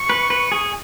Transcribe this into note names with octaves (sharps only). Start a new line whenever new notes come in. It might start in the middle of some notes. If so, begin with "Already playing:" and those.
Already playing: C#6
B4
B4
G#4